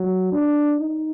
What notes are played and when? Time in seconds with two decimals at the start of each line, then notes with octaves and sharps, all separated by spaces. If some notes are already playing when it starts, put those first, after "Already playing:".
Already playing: F#3
0.32 D4
0.80 D#4